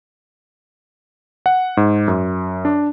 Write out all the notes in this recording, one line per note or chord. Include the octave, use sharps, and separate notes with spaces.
F#5
G#2
F#2
D4